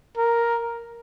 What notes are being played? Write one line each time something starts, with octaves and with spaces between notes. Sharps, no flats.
A#4